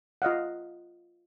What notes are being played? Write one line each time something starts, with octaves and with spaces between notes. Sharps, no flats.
F4 D#5 F5 F#5